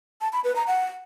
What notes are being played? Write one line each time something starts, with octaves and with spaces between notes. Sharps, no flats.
A5
B5
B4
A#5
F#5